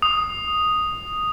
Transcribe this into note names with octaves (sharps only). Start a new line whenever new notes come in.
D#6